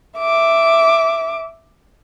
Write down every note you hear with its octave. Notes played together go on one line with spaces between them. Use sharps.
E5 D6